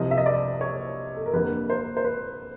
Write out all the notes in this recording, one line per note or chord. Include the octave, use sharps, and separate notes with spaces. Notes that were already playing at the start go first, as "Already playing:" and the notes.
Already playing: C2 C3 F3 D#5
E5
D#5
D5
C#5
A4
A#4
F2 D3 G3 A#3 B4
C5
C5
B4